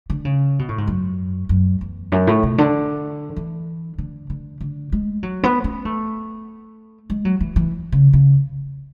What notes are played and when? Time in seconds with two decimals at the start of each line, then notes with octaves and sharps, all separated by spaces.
0.10 D3
0.25 C#3
0.59 B2
0.69 A2
0.78 G#2
0.87 F#2
1.49 F#2
1.81 E2
2.12 F#2
2.27 A2
2.43 B2
2.58 D3
3.36 E3
3.98 D3
4.30 D3
4.60 D3
4.92 G#3
5.23 F#3
5.43 B3
5.64 C#4
5.85 A3
7.10 G#3
7.25 F#3
7.40 E3
7.56 E3
7.92 C#3
8.13 C#3